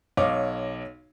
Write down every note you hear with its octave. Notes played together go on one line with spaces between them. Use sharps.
B1 C#5 D#5 F5 D6